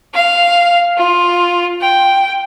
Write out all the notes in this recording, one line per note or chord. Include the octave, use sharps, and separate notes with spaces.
F5
F4
G5